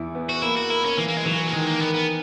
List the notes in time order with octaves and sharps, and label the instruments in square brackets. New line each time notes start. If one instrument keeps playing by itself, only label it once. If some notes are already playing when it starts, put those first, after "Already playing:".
Already playing: [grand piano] E2 E4
B3
[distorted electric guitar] F#4
[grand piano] A#3 [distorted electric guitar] E4
[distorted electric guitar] F#4
[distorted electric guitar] E4 [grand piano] A#4
[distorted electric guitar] C#4
[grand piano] E3 [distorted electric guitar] A#3
[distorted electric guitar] A#3
G#3
[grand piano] E3 [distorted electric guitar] F#3
[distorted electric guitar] A#3
[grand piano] D#3 [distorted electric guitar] G#3
[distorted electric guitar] A#3
[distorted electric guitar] B3 [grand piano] A#4
[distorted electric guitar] B3